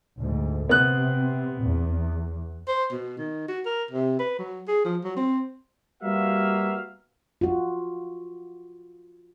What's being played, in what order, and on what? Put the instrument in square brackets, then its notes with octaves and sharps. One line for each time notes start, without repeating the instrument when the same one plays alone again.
[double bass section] D2 G#2
[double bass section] C3 C4 [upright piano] B3 F#6
[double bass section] E2
[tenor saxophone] C5
B2
D#3
F#4
A#4
C3
B4
F#3
G#4
F3
F#3
C4
[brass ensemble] G3 A#3 B3 F#4 E5 F5
[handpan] F4 F#4